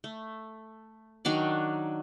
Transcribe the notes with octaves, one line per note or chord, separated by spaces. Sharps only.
A3
D#3 F#3 D4 D5